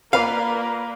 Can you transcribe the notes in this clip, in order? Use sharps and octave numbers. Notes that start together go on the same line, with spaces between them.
A#3 F4 B4 D5 F5